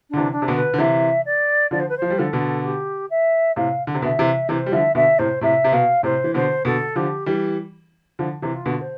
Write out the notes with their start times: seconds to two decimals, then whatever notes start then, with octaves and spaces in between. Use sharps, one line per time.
0.09 D3 D4
0.17 C3 E3
0.32 D4
0.42 C3
0.48 B2 D3
0.56 B4
0.74 D3
0.78 C3 E3 E5
1.25 D5
1.71 D3 F3 D5
1.80 C5
1.89 B4
1.97 F3 C5
2.10 G3
2.18 D3 F3 A4
2.33 B2 D3
2.63 G4
3.10 E5
3.56 A2 C3 F5
3.87 D3
3.94 C3
4.02 B2 D3 E5
4.19 C3 E3
4.49 C3 E3 C5
4.66 G3
4.72 D3 F3 E5
4.95 B2 D3 E5
5.18 A2 C3 C5
5.41 A2 C3 E5
5.64 C3
5.72 B2 F5
6.03 A2 C3 C5
6.24 E3
6.34 B2 D3 C5
6.65 B2 D3 A4
6.96 D3 F3 G4
7.26 E3 G3
8.19 D3 F3
8.42 C3 E3
8.50 F4
8.66 B2 D3
8.81 C5